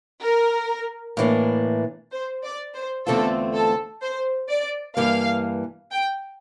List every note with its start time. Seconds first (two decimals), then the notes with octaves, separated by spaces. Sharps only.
0.22 A#4
1.17 A2 E3 A#3 D4
2.12 C5
2.43 D5
2.75 C5
3.06 E2 D3 A3 C4 F4 A4
3.54 A4
4.01 C5
4.49 D5
4.97 G2 E3 A#3 F5
5.91 G5